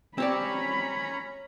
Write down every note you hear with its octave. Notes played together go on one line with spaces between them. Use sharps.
C4 C#4 G4 C#5 D5 A#5 B5